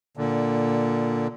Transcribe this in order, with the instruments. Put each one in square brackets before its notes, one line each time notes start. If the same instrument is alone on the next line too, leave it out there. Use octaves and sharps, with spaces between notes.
[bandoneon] A#2 D3